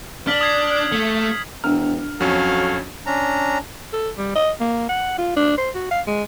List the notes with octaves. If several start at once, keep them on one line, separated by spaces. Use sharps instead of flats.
D4 F6 B6 F#7
D#6 G#6 C7
A3
E1 D4 A#4 A#5 F6
F2 F#3 C#4 A4 C#5 F5
C#4 D4 A#5
A4
G3
D#5
A#3
F#5
F4
D4
C5
F#4
F5
G#3